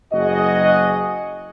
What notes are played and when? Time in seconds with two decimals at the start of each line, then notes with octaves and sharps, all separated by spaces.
0.12 F#1 F#4 G#4 D#5